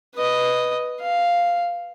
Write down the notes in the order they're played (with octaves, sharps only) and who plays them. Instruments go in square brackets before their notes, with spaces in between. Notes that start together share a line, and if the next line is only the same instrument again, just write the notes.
[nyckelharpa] B4 D#5
F5